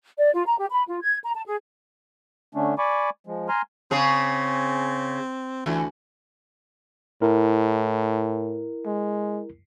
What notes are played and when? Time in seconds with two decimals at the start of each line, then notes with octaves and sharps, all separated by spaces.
0.18 D5
0.33 F4
0.46 A#5
0.57 G4
0.70 B5
0.87 F4
1.02 G#6
1.22 A#5
1.34 A5
1.45 G#4
2.55 D3 A3 C#4 D4
2.78 D5 G#5 B5 C#6 D6
3.27 F3 G#3
3.49 G#5 A#5 C6 F6
3.91 C#3 C4 C#4 G#4
5.66 D2 E3
7.22 A2 E4 A#4
8.86 G#3